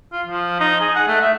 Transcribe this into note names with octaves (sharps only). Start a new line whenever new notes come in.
F4
F3
D#4
G#4
F#5
A3
E5